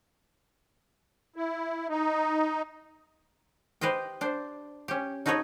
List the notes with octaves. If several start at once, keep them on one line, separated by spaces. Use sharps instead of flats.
E4
D#4
G4 B4 C5 D#5 G5
D4 C5
C#4 G4
D#4 F#4 A4 B4 C#5 D#5